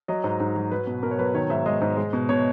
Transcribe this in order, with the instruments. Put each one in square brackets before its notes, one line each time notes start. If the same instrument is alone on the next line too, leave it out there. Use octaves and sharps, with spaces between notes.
[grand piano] F#3 D#5
G#2
G#2
F#3
F#3 B4
B2
B2 A#4
C#5
F#3 B4
D#3 C#5
G#2 E5
G#3 D#5
G#2
G#3
B2
B2 C#5